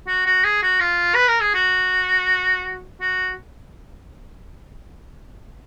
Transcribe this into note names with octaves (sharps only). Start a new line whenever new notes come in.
F#4
F#4
G#4
F#4
F4
B4
A#4
G#4
F#4
F#4